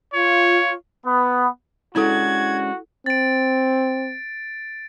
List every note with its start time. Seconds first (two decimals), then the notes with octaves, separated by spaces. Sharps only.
0.13 F4 C#5
1.06 B3
1.95 G#3 C#4 D4 E4 F#4 A4 G#6
3.06 C4 A6 D7